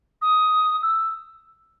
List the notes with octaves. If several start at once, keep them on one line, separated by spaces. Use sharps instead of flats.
D#6
E6